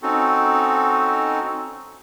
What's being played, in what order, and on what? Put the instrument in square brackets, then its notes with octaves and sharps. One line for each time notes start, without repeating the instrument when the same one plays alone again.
[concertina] C4 C#4 D#4 F#4 A4